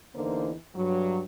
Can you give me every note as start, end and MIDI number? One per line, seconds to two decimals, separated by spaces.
0.15 0.52 40
0.15 0.52 50
0.15 0.52 52
0.15 0.52 58
0.15 0.52 63
0.15 0.52 72
0.76 1.21 43
0.76 1.21 54